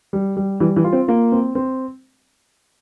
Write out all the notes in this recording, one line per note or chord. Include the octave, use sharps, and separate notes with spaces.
G3
G3
E3 G3
E3
F4
C4
A#3 F4
C4
C4